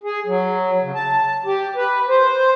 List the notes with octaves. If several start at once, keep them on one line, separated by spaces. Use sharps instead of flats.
G#4
F#3
C#3
A5
G4
B4
C5